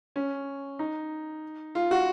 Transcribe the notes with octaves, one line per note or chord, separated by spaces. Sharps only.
C#4
D#4
F4
F#4